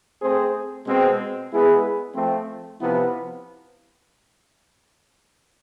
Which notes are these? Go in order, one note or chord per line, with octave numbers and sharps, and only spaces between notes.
A3 C4 G#4 C5
B2 G#3 C4
G#3 B3 E4 G#4 B4
F3 A3 C4
C3 F3 B3 E4 B4